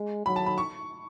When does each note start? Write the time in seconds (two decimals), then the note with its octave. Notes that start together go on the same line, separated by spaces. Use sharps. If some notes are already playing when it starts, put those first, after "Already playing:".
Already playing: G#3
0.26 F#3 B5
0.36 A5
0.46 B5
0.58 C#6